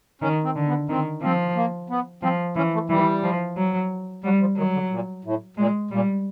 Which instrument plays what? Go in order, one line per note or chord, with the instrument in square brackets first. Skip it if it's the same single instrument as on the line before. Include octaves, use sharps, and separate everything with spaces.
[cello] D#3 [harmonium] C#4
[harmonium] C4
[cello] D3
[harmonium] B3
[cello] D#3 [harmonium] C4
[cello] F3 [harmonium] C4
[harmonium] A#3
B3
[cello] F3 [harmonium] C4
[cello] E3 [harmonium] C#4
[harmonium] A3
[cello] E3 [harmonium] G3
[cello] F3
F#3
[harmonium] F#3 [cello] G3
[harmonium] F3
[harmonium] D#3 [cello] F#3
[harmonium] D3
A#2
A2
[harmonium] A#2 [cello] G#3
[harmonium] A#2 [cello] G3